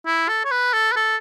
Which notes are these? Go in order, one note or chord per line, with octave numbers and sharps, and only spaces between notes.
E4
A4
C#5
B4
A4
B4
A4